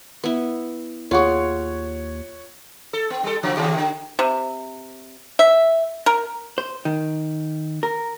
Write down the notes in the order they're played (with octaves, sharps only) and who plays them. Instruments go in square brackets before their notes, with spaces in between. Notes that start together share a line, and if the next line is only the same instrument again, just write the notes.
[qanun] B3 E4
[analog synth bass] D#2 [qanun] F4 G#4 [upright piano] C#5 F#5 C#6
[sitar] A4
B3
G3 A4
C#3 F3 F#3
D#2 C#3 G4
D3
[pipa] C3
E5
A#4
[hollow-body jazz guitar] C5
D#3
A#4